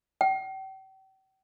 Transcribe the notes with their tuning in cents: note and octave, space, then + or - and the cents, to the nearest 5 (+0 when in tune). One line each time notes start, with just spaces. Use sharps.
G5 -40